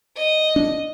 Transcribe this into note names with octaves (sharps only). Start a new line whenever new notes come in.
D#5
D4